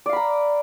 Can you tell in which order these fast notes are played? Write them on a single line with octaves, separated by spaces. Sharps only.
D5 F5 B5 A#5